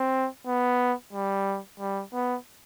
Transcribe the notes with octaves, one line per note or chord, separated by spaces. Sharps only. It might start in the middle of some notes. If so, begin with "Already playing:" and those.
Already playing: C4
B3
G3
G3
B3